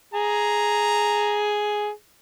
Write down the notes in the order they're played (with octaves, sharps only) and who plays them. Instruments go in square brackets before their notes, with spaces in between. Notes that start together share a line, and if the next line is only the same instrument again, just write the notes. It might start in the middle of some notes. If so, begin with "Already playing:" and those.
[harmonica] G#4 [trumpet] A#5